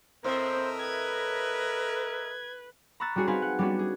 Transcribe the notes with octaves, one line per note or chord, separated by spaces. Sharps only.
A2 C4 A#4 C5 D#5 E5
B4 G#6
A#5 B5 C#6 E6 F#6 A6
G3 C#4 F#4 G#4 C#5
C4 D#4 B4 F5 G#5
F#5
G3 B3 C#4 D4 F#4
G#4